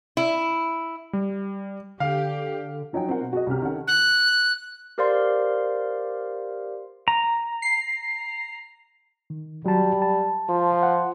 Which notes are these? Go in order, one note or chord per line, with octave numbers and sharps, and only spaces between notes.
E4
G3
D3 G4 F5
F3 F#3 D#4 F4 G5
C4 F4 A#4 F#5
B2
F#4 G#4 D#5
C2 C3 C#4 G4 F6
D#3 C#4 A4 F#5
F#6
G4 A#4 C5 D5 F5 C6
A#5
C7
D#3
F#3 G3 A5
A5
F3
F#5